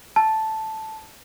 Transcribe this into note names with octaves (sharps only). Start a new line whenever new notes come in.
A5